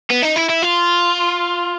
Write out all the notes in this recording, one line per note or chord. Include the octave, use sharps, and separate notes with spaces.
B3
D#4
E4
E4
F4